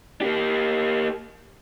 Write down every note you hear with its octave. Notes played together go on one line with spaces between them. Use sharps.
A#3 G4